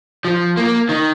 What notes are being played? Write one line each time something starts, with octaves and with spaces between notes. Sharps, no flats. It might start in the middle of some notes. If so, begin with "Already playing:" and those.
F3
A#3
D#3